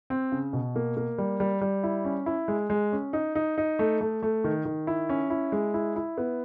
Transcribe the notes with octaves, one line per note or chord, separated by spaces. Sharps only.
C4
C#3
B2
A#3
A#3
G3
G3
G3
E4
C#4
E4
G#3
G#3
C#4
D#4
D#4
D#4
A3
A3
A3
D#3
D#3
E4
C#4
E4
G#3
E4
E4
B3